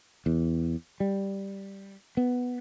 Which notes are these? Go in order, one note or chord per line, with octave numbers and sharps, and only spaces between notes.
E2
G3
B3